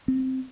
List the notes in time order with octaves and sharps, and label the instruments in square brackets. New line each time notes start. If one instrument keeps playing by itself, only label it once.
[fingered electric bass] C4